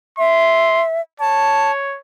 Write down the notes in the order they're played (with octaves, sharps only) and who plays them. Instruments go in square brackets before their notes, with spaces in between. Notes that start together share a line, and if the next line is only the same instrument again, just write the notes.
[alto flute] E5 [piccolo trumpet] C6
[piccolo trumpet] C#5 [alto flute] A5